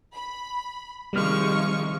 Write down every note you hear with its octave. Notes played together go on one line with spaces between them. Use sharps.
B5
C3 D#3 F3 G3 G#3 C#6 F6